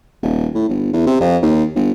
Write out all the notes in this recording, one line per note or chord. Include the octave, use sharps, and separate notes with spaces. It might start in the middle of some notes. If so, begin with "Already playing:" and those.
D#1
A2
G1
E2
C3
F2
D#2
G1